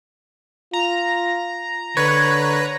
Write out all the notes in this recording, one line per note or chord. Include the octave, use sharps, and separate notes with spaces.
F4 A#5
D3 B4 C#5